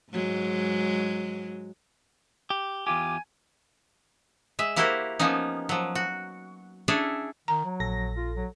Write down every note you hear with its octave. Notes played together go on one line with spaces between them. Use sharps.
G#2 F#3 G#3
G4
E2 F4 G4 G#5 D6
G#3 E5
A#3 E4 F#4 G4 A#4 C5
F3 A#3 B3 C#4 D#4
F3 F#3
F#4
C#4 D4 E4 G#4 A4 C#5
D#3 A#5
F#3
A#1 A4 A#6
F4
F#3